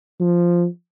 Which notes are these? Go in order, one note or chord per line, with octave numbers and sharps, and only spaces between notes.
F3